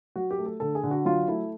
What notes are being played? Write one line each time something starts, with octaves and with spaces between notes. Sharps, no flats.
F#3 F#4
G4
A3
A4
D3 A4
G#4
D3
F#4
F#3 F4
A3 E4